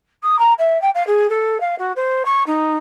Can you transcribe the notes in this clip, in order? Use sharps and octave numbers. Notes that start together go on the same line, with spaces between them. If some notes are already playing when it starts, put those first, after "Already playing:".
D#6
A#5
E5
G5
F5
G#4
A4
F5
F#4
C5
C#6
D#4